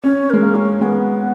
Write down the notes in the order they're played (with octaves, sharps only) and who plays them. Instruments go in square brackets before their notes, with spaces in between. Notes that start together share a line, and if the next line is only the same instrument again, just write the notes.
[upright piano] C#4 [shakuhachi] C#5
[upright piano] G#3 [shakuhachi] A#4
[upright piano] A#3
[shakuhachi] C#4
[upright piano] G#3 [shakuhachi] B3